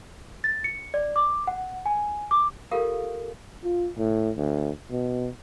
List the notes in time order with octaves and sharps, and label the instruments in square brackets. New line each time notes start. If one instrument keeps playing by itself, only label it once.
[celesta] A6
C#7
D5
D6
F#5
G#5
D6
[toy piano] F4 G4 A4 A#4 F5
[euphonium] F4
A2
D2
B2